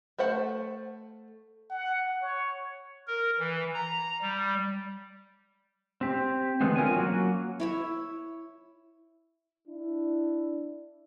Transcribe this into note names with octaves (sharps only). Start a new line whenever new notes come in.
A3 C5 F#5 A5
F#5
C#5
A#4
E3
A#5
G3
C4 G4
D3 E3 G#3 A3 B3 C4
F4 A#4 C#5 G#5
F#3 A#3 C#4 F#4
E4 C#5 E5
D4 E4